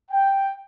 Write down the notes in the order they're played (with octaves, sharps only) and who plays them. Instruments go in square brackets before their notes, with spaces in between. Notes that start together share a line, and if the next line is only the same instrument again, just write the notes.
[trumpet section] G5